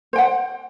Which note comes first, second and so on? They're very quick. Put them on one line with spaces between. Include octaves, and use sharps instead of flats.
C5 G5 F#5